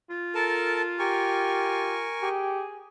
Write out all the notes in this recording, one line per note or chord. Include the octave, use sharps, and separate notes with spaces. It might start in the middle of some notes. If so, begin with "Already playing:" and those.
F4
A4 A#4 A5
G4 A#4 G#5 C#6
G4 G#4